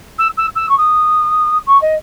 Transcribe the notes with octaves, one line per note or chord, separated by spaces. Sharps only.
E6
E6
E6
C#6
D#6
C#6
D#5